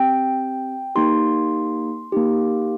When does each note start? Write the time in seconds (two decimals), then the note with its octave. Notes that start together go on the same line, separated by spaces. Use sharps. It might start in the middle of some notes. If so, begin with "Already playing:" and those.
Already playing: C4 G4 G5
0.95 A#3 D#4 G4 C6
2.12 A#3 D#4 G4